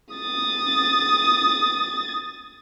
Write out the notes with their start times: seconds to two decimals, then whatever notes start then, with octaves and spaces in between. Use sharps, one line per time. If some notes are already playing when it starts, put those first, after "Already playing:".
0.15 D#6 A6